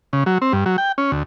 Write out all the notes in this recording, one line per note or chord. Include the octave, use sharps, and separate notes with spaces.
C#3
F#3
C4
G2
F#3
G5
C#4
D2